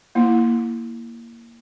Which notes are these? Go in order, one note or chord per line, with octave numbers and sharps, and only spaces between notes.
A#3 E4